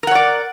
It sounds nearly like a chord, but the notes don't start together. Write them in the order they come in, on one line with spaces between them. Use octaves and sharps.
A#4 F#5 C#5 D5